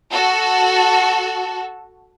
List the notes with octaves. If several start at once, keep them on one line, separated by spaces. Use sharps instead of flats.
F#4 A4